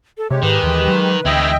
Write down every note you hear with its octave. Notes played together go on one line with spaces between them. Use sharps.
A4
C3 G#3 G4 C#5
G#2 D#3 B4
D#2 E3
F#3
D2 E3 G#3 D#5 E5 G5